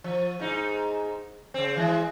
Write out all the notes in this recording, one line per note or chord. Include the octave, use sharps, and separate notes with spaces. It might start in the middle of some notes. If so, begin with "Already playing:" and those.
F3
G#2 D#4
C#3 C4
E3 G#3